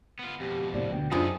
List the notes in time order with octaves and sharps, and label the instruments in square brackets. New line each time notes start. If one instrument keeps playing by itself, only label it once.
[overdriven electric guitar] B3 F4
[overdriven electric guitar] F2 B2 [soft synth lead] G4
[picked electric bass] A2 C3 [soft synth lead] D5
[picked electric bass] D2 B2 [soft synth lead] G5
[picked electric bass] F#2 D4 [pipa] C3 D#3 G#4 [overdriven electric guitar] C#4 A4 [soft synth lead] F4